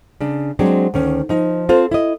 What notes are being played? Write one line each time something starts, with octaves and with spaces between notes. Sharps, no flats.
C#3 D4
F#3 G#3 C4 D4
D2 D#3 C#4
F3 D#4
C4 F4 A4 C5
E4 D#5